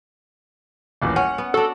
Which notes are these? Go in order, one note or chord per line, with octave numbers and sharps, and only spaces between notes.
D#1 A1
C#4 F#5
B3
D4 F#4 A4